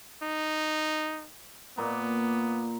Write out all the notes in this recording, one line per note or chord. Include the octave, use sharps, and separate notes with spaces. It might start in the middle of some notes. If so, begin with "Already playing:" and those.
D#4
A#2 A#3 B3